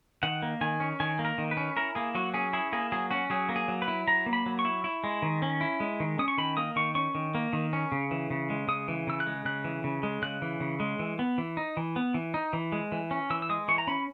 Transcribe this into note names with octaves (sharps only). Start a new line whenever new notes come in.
D#3 F#5
A#3
D#3 G#5
C#4
D#3 G#5
A#3
A#4
D#3
B4
C#4
E4 A#4
A#3 G#4
F#3 F#4
C#4 G#4
E4 G#4
A#3 G#4
F#3 G#4
C#4 F#4
F#3 G#4
A#3
G#4
F#3
B4
E4
F#3 A#5
A#3
B5
F#3
C#6
E4
E4
G#3
D#3
C#4
E4
G#3
D#3
C#4 D#6
C#6
D#3 B5
A#3 D#6
D#3 C#6
C#4 C#6
D#3
A#3
D#3
C#4
C#3
E3
C#3
G#3
C#3 D#6
E3
C#3 E6
F#6
G#3
C#3 F#6
E3
C#3
G#3
C#3 F#6
E3
C#3
G#3
E3
B3
E3
D#4
E3
B3
E3
D#4
E3
G#3
E3
C#4
E3 E6
E6
G#3 D#6
E3 C#6
A#5
C#4 B5